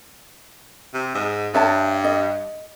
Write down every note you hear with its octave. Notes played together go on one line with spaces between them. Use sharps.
C3
G#2
G2 C#5 E5 A5
D#5